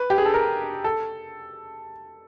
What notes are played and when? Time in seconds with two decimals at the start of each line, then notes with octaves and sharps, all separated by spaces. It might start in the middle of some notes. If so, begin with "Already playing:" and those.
Already playing: B4
0.10 G4
0.18 G#4
0.26 A4
0.34 A#4
0.84 A4